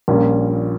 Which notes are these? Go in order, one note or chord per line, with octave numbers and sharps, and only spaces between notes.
A#1 A#2 G3 A#3 C#4